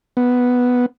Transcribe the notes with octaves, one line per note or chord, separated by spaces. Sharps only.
B3